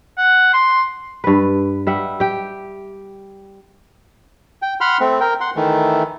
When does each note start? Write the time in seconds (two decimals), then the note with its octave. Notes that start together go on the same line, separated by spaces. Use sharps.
0.18 F#5
0.53 C6
1.24 G2 B4
1.87 G3 E5 F#5
2.20 G4 G5
4.62 G5
4.81 F#5 B5 C6 F6
5.00 A3 C4
5.21 A#4 G5
5.41 F#5 C6
5.56 D#3 E3 A3